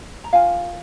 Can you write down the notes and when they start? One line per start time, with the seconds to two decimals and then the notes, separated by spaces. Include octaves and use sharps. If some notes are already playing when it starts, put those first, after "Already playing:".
0.24 A#5
0.33 F4 A#4 F5 G#5